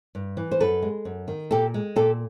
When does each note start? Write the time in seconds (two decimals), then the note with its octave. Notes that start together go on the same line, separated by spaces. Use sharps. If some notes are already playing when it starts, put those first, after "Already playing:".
0.15 G2
0.37 E3
0.51 C5
0.60 F#2 A4 B4
0.82 G#3
1.05 F#2
1.28 D#3
1.51 A#2 G4 A4
1.74 G#3
1.96 A#2 G4 A4